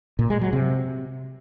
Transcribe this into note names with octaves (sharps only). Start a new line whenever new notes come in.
A#2
G#3
F#3
C3